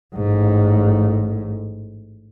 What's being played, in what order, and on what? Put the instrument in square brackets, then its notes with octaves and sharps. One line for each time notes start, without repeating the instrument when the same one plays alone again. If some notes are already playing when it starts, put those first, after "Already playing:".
[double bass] A1 G#2